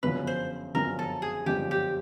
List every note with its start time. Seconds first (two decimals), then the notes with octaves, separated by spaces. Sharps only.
0.03 G1 F#2 C#3 F3 B4
0.27 C5
0.74 G1 F#2 C#3 F3 A#4
0.99 A4
1.22 G#4
1.46 G1 F#2 C#3 F3 G4
1.71 G4